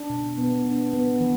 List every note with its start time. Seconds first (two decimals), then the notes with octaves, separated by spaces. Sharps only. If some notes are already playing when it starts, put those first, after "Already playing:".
Already playing: D4
0.10 B2
0.38 B3
0.65 D4
0.93 B3
1.21 E3